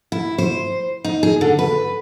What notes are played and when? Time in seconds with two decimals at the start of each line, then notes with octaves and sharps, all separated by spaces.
0.12 E4
0.38 C5
1.05 D#4
1.23 G#4
1.41 D3
1.59 B4